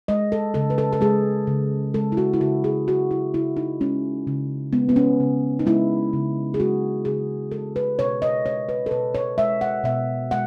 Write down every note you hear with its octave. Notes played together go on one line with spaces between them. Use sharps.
G#3 D#5
A4
C#3 A4
B4
A4
A4
G#3 G#4
C#3
G#3 A4
E4
F#4
E4
C#3 F#4
G#4
G#3 F#4
E4
C#3 E4
D#4
G#3 C#4
C#3
G#3 B3
B3
C#4
C#3
D#4
G#3 E4
C#3
G#4
G#3 F#4
C#3 G#4
G#3 A4
B4
B2 C#5
D#5
G#3 C#5
B4
A4
B2 B4
C#5
G#3 E5
F#5
B2 E5
G#3 F#5